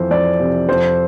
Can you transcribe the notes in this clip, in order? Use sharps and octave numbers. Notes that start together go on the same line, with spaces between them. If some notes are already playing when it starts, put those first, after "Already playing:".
Already playing: F2 E3 C5
F2 D5
C3
F2 C5